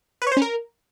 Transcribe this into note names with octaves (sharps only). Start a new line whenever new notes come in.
B4
C#5
C5
C#4
A#4